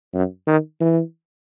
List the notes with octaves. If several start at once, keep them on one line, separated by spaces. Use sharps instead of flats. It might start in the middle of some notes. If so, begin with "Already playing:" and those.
F#2
D#3
E3